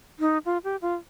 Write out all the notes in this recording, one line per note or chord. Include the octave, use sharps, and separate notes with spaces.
D#4
F4
G4
F4